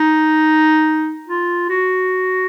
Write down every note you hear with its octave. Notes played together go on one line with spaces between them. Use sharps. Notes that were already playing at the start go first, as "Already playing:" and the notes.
Already playing: D#4
F4
F#4